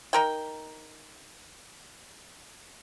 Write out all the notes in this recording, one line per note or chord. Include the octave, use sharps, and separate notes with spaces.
D#4 A#4 G5